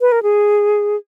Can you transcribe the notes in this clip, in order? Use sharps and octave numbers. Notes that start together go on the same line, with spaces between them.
B4
A#4
G#4